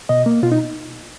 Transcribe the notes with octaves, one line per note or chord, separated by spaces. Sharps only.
B2 D#5
A#3
B2 F4
D#4